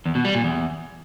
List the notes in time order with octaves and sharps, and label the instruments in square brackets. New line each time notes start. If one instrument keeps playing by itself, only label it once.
[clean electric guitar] E2
B2
G3
A#2
E2